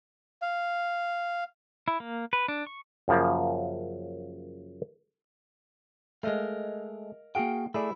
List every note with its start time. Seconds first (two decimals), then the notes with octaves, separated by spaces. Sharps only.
0.42 F5
1.88 E4
2.00 A#3
2.33 B4
2.48 D4
2.67 C#6
3.08 F#2 C#3 F3 A#3
6.23 G#3 A3 A#4 D#5 F5
7.35 A#3 F#4 G#4 F5 G5
7.74 A3 E4 G#4 D5